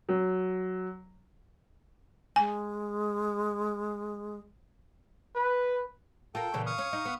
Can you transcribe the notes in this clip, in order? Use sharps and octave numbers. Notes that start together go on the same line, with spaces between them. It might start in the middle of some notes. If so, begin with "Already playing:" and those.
F#3
G#3 G#5
B4
F4 A4 A#4 G5
A#2 C#3 E3
F5 C#6 D#6
C#4
D#4
B3